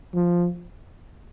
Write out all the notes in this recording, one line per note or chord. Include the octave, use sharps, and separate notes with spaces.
F3